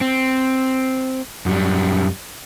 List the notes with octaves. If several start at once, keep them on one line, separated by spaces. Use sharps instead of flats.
C4
F#2 G3